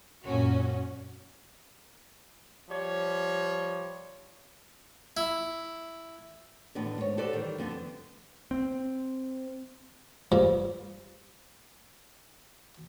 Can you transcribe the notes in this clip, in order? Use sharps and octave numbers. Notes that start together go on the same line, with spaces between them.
F#2 A#2 C#4 F#4
F3 G3 C#5
E4
E2 A2 D3 D#3 B3 D4
G#2 C#5
F#4 G4 A4 B4 C5 D5
D#3 E3 G3
F2 D3 B3
C4
G2 F3